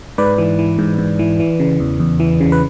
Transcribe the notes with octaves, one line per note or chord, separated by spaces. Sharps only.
G#2 B4 D5
E3
E3
G#2
G#2
E3
E3
C#3
E2
E2
E3
C#3
B4